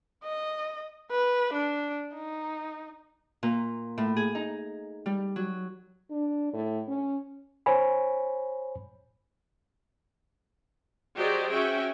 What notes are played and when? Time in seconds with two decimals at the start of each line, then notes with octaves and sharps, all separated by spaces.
0.24 D#5
1.10 B4
1.53 D4
2.14 D#4
3.43 A#2
3.98 A2
4.17 G#4
4.35 D#4
5.06 G3
5.36 F#3
6.11 D4
6.54 A2
6.88 C#4
7.66 C5 C#5 G#5 B5
11.17 F#3 G4 G#4 C5 D5 D#5
11.50 C#4 F#4 E5 G5